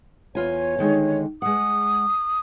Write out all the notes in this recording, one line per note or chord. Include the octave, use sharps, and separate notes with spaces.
E2 F4 C#5 G#5
D3 D#3 G#3
G#3 F#5 D#6